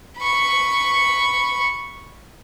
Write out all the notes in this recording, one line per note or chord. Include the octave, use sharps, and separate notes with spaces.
B5 C#6